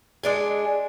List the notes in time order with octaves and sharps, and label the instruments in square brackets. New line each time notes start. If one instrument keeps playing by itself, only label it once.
[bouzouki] G#3 D4 G#4